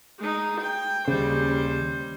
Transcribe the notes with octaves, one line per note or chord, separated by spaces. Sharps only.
G#3 D#4
G5
D#2 C#3 G3 C5